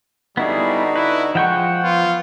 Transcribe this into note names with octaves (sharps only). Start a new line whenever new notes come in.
D3 G3 B3 D#4 E4 F#4 G#4
E4 B4
F3 G#3 F#5 G5 C#6
B3 F4